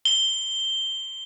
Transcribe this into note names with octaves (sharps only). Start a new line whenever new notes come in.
G7